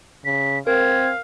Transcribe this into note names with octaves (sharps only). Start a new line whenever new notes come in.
C#3 B6
C4 A#4 F5 G#6